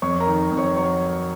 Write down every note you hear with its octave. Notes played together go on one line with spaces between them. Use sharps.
F2 C#5 C#6
A#4 A#5
D#3
F2
C#5 C#6
F#3 C#5 C#6